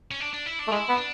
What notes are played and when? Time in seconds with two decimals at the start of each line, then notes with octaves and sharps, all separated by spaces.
0.11 C#4
0.20 D4
0.33 D4
0.46 E4
0.59 D4
0.68 A3
0.72 G#3 E4
0.89 B3
0.97 D4